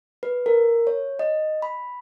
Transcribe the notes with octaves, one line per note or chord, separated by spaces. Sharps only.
B4
A#4
C#5
D#5
B5